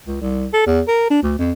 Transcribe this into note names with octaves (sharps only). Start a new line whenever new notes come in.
C#2
C2
A4
E2
A#4
D4
D2
F2